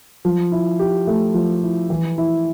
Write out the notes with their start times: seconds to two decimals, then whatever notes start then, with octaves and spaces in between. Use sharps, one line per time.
0.25 F3
0.52 E4
0.79 G4
1.07 A3
1.34 F3
1.63 E4
1.90 E3
2.18 E4